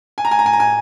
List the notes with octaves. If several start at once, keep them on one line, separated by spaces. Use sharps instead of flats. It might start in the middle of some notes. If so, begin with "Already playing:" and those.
G#5
A#5
G#5
A#5
G#5
A#5
G#5